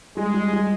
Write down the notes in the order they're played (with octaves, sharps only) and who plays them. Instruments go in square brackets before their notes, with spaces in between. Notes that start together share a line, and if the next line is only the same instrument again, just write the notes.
[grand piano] G3 [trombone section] G#3
[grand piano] G3
G3